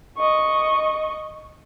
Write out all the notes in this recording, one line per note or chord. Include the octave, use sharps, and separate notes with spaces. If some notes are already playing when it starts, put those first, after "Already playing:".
D#5 C#6